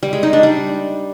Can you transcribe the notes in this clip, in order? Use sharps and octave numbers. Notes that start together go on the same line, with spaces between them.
G3
G#3
D#4
D4
G3